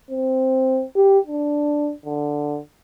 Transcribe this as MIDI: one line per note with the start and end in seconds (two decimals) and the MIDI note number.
0.10 0.85 60
0.96 1.19 67
1.27 1.92 62
2.05 2.58 50